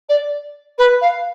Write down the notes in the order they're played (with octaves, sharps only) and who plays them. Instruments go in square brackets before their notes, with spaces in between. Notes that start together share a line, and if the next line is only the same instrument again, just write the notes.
[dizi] D5
B4
F5